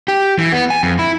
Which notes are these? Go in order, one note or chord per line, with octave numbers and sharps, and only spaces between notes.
G4
E3
B3
G#5
F2
E4